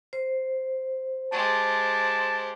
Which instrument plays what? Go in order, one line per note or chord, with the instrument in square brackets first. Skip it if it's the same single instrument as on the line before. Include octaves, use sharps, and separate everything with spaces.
[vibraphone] C5
[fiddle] G#3 G4 [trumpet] A5